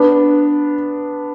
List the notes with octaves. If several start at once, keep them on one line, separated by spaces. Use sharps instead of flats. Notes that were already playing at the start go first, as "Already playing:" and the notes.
Already playing: B3 D4